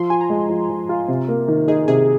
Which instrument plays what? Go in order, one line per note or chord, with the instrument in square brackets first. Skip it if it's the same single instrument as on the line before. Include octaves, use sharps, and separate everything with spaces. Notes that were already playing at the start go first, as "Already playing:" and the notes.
Already playing: [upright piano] F3 [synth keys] C6
[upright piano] F4 [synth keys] G#5
[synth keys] A#5
[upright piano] G#3
F3
F3
F4
C3
A#3
D#3
[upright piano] D#4 [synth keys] G#4
[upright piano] C3 [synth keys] G#4